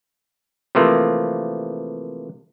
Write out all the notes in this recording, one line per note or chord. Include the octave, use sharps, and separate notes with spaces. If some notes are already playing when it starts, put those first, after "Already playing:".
C3 E3 F3 A3 A#3